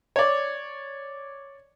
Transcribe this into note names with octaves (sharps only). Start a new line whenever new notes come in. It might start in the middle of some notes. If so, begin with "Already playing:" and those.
C#5 D5